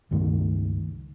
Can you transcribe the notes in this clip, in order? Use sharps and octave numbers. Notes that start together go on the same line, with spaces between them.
C#2 G2 D#3 A3